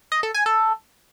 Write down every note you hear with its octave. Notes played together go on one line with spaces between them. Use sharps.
D#5
A4
G#5
A4